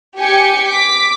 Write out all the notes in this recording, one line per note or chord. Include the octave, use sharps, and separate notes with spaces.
G4 G#5 C#7
D6 B6